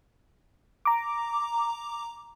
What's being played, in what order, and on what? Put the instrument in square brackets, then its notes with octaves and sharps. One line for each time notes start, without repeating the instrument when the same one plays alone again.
[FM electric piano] A#5 D6